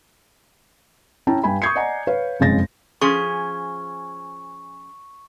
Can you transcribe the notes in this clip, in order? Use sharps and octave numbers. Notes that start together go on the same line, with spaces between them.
C#4 E4 G5 A5 A#5
G2 G5 G#5 B5
C#6 D#6 G6 G#6 C7 C#7
D5 D#5 F#5 G#5 A#5
B4 C#5 F5
F#1 F2 C#3 G#3 A6 A#6
F3 C#4 G#4 C#6